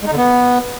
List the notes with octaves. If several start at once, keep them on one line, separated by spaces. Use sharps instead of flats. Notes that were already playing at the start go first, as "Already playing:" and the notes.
G#3
D#4
D3
B3